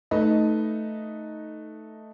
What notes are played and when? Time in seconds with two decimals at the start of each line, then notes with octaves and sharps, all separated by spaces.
0.11 A3 D#4 B4 D#5